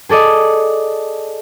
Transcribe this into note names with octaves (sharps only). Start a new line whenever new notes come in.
G#4 A4 D5 D#5